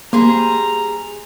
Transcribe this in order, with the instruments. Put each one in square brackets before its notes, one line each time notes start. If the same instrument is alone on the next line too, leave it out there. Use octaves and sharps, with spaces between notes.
[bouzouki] G3 G#4 C5 [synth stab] A#3 [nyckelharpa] A#5